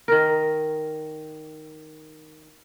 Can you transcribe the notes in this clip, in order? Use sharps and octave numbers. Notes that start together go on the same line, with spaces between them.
D#3 A#4